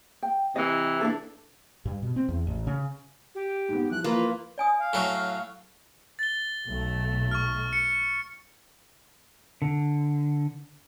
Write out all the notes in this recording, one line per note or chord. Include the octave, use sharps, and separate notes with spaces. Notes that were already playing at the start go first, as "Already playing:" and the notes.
G5
C3 E3 D#5
D4 D#4 A4
G2
B2
C4
E2
A1
C#3
G4
G#2 B3
E3 F3 F#6
A#3 F4 B4
D5 G#5 D#6
F5
A2 F#3
A6 G7
B1 A3
C#6 F6
C#7
D3